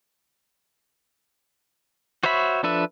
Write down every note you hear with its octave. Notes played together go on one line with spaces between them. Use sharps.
F#4 C5 C#5 E5 B5
F3 D4 A4 B4 E5